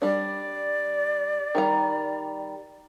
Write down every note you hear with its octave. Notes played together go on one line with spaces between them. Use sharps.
G3 D4 D5
D#3 G3 A#5